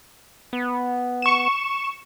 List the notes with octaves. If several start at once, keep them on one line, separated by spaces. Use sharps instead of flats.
B3
C#6 E7